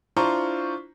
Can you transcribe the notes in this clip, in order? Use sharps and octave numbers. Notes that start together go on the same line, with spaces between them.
D4 E4 F4 C5 A#5 C#6